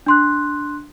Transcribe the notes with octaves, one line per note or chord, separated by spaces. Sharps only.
D4 C6 F#6